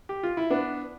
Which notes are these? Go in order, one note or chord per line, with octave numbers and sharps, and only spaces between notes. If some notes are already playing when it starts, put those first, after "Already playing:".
G4
F4
E4
B3 D4